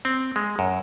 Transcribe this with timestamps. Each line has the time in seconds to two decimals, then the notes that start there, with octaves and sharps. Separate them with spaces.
0.05 C4
0.36 G#3
0.59 F#2